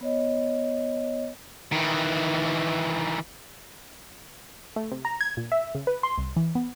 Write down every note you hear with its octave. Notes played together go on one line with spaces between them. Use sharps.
B3 C#5 D#5
D#3 E3
A3
C3
A#5
G#6
A#2
E5
C#3
B4
C6
C2
E3
B3